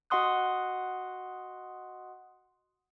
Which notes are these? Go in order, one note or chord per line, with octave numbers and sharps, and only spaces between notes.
F#4 D#5 F#5 C6 D#6 F#6